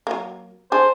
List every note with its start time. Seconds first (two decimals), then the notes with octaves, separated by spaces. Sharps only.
0.07 F#3 A#3
0.72 D4 G#4 C5